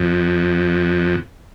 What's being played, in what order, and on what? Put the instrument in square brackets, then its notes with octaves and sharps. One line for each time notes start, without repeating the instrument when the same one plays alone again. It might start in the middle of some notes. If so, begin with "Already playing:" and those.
Already playing: [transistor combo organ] F2